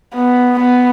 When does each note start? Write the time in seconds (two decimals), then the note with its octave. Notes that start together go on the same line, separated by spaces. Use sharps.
0.14 B3
0.60 B3